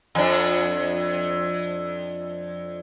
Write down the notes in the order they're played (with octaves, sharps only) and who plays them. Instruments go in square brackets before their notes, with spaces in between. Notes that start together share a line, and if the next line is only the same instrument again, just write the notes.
[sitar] F2 D4